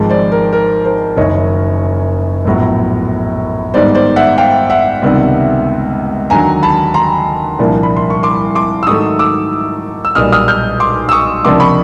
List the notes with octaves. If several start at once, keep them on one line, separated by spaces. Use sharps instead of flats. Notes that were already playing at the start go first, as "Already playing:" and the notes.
Already playing: G#1 G#2 F3 G#3
C5 D5
A#4
A#4
A#4 C5
F#1 F#2 D#3 C#5 D#5
A#1 A2 F#3 B3
G#2 D#3 G3 B3 C5 D5
C5 D5
E5 F#5
F5 G5
E5 F#5
C#2 C3 D#3 G3 B3
D#2 D3 F#3 G#5 A#5
A5 B5
A#5 C6
C2 A#2 F3 A#3 D4
B5
C6
C#6
C6 D6
C6 D6
E6
G#2 D#3 F#3 A3 C#6 D#6
D6 E6
E6
B1 A#2 G3 D#6 F6
D#6 F6
F6 G6
C6 D6
E6
C#6 D#6
C#2 C3 F3 A#3 D4 C6 D6
B5 C#6